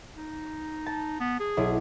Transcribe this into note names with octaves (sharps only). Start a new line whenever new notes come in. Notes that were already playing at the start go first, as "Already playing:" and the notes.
D#4
A5
B3
G#4
B1 E4